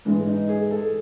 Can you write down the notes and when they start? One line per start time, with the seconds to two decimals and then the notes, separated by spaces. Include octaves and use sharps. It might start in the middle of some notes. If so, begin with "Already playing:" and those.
0.05 G#2 E3 G#3 D4
0.26 D#4
0.49 G#4
0.71 A4